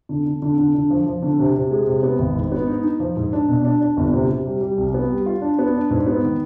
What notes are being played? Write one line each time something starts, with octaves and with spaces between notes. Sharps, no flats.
D3
D3
D3
D3
D3
F3
F3
D3
C3
C3
G#3
C3
B3
G#1
G#2
B3
D#4
D#4
F3
G#2
D4
B2
D4
D4
G1
C3
C3
G3
G3
C2
B3
G3
F4
D4
B3
D4
G#2
B3
D#3